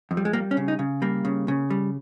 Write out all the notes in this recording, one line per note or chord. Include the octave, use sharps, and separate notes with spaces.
F2
G3
G#3
G3 A#3
C#4
C#3
D#4
C#3
G3 A#3
C#3
C#3
G3